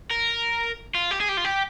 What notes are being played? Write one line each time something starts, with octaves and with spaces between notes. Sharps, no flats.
A#4
F4
G4
G#4
G4
F4
G4